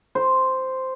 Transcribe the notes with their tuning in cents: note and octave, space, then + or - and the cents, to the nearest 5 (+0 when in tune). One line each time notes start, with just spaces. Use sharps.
C5 -5